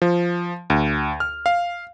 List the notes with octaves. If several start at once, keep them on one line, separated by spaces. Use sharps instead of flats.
F3
D2
F6
F5